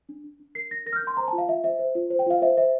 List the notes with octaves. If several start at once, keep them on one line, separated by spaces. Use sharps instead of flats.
D4
D4
D4
A#4 C7
D4 A#6
A#4 A#6
F6
G6
D4
C6
C5 A#5
A5
F4
F5
F4 E5
C5 E5
C5
F4
C5
G5
F4 F5
C5 E5
C5 E5